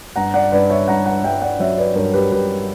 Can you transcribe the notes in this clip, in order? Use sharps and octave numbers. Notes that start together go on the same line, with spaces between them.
G2 F#5 A#5
D5 F#5
G2 B4 D5
C#5 E5
G2 F#5 A#5
F#5 A#5
G2 E5 G5
D5 F#5
F#3 C#5 E5
B4 D5
G2 A#4 C#5
G4 B4
G2 G4 B4